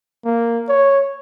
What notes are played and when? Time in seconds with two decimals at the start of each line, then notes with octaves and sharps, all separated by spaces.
0.25 A#3
0.69 C#5